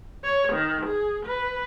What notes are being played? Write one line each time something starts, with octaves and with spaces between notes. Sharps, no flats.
C#5
D#3
G#4
B4